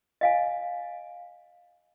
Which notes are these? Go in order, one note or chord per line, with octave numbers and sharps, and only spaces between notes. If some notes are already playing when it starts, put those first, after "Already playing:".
D#5 F5 G#5